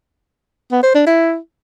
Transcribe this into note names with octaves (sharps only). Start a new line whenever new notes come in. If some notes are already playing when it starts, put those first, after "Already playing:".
B3
C5
D4
E4